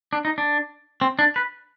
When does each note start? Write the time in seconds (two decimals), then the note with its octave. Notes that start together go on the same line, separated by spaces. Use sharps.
0.13 D4
0.25 D#4
0.38 D4
1.01 C4
1.19 D4
1.36 B4